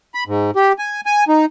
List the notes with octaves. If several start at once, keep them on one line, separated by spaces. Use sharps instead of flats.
B5
G#2
G4
G#5
G#5
D#4